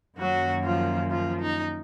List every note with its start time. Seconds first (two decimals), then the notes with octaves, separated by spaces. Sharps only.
0.18 F#2 D#3 F#3 A#3 F#4
0.64 F3 F4
1.10 F3 F4
1.40 D#4